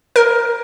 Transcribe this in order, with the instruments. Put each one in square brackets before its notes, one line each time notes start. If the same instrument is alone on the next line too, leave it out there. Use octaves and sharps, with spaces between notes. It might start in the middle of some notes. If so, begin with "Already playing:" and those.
[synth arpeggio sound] A#4